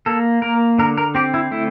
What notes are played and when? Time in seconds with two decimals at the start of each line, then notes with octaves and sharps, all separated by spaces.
0.06 A#3 A4
0.42 A#3 A#4
0.78 D3 A#4
0.98 A#4
1.15 C4 G4
1.34 E4
1.51 A3 E4